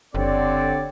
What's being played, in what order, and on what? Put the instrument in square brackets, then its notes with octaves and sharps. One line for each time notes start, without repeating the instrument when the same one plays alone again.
[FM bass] F#1 [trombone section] D3 C4 [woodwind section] G4 C#5 D5